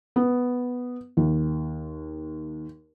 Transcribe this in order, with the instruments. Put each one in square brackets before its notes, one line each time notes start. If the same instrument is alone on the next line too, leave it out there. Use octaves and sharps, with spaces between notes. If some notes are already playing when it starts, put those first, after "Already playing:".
[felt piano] B3
D#2